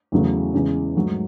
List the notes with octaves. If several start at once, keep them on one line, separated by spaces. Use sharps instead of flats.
E2 C#3 F#3 A3
E2 C#3 G#3 C#4
G#2 F#3 A3